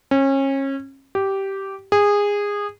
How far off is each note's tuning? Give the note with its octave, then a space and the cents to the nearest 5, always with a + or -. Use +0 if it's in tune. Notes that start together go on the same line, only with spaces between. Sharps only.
C#4 -30
G4 -10
G#4 -20